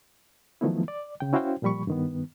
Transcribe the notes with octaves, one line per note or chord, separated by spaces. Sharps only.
D#3 F3 F#3 A3 B3 E4
D5
C#3 G5
C#4 E4 F#4 C5 F5 G5
A#2 F3 G3 B5 C#6
G2 D#3 B3